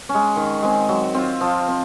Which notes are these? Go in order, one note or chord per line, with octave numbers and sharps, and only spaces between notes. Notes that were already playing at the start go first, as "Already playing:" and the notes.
C#4
G#3
D#3
G#3 C4
F#3
C4 F4
F3
C4